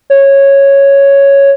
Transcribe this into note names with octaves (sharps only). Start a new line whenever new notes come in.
C#5